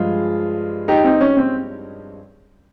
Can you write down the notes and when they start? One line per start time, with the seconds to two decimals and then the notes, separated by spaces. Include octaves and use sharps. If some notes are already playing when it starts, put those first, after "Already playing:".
Already playing: G2 F3 G#3 F4 G#4
0.88 D#4 G4
1.04 C4 D#4
1.21 C#4
1.37 C4